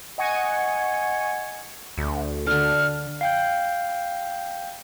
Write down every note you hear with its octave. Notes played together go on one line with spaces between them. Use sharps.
D#5 F#5 G#5 C#6 G#6 C#7
D2
D3 D4 A4 F6
F5 G5 G6